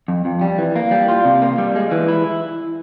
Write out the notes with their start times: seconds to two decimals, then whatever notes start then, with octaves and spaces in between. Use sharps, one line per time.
0.08 F2
0.25 F2
0.41 G3
0.58 E3
0.76 A#3
0.91 G3
1.08 F4
1.25 C3
1.42 A#3
1.58 G3
1.76 G#3
1.91 E3
2.08 E4